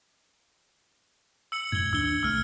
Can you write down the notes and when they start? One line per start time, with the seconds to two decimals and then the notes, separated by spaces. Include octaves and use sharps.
1.52 E6 C#7 F#7
1.72 F#2 A2 G#6 G7
1.93 D#2 D4 E6 G7
2.23 C2 A3 E6 F6